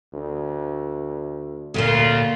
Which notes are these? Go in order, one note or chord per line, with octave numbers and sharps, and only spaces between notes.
D2
D2 A#2 C#3 A#3 F4